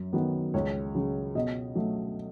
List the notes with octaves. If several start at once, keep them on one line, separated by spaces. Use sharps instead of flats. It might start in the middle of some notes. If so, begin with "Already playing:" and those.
Already playing: F#2
D#3 F#3 B3
C#2 C#5
C#3 F#3
B2 D#5
F#3 A3